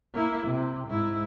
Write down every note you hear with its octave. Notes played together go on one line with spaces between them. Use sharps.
A#3 E4
C3
G#2 E4